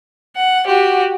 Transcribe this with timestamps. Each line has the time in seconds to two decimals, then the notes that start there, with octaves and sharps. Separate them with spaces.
0.35 F#5
0.67 F#4 G4